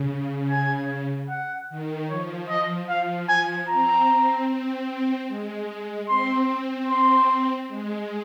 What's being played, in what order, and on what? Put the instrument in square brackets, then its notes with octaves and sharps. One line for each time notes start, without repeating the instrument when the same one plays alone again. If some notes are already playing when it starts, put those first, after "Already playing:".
Already playing: [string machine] C#3
[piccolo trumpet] G#5
F#5
[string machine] D#3
[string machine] F3 [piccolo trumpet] C#5
[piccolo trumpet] D#5
[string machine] F3 [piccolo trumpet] F5
[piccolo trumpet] G#5
[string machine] C4 [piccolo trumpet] A#5
[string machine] C4
C4
G#3
[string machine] C4 [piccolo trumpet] C6
[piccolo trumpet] C6
[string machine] G#3